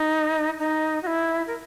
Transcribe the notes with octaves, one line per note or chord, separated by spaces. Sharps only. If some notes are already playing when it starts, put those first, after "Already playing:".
Already playing: D#4
D#4
F#4
E4
A#4